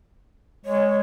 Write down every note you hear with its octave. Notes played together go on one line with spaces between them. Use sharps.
G#3 C#5